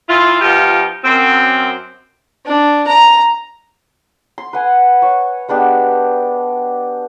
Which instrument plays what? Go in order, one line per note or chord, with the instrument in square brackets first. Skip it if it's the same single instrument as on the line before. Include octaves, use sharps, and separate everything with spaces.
[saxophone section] E3 E4 F4
F3 B3 D#4 F4 G4
F#2 C4
[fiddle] D4
A#5
[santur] C6
B4 F#5 G#5
C#5 C#6
G#3 B3 D4 G4